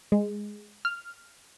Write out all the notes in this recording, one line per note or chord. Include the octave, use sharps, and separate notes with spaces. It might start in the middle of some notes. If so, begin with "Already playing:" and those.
G#3
F6